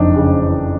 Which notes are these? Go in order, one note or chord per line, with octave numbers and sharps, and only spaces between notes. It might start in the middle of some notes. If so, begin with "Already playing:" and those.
Already playing: F#1 F2 D4 D#4
C#3
E3